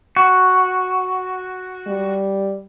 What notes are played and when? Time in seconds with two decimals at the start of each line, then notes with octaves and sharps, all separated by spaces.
0.17 F#4
1.87 G3